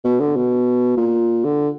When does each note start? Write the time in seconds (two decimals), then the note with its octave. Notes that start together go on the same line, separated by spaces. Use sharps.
0.05 B2
0.20 D3
0.36 B2
0.97 A#2
1.44 D3